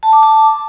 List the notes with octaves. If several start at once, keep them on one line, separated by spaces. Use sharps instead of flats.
A5
D6
A5